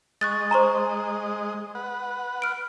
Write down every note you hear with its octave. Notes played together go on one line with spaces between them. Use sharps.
G#3 D#5 C#6 F#6 A6
C5 G#5 A#5 C6 C#6
B4 F#5
F6 D7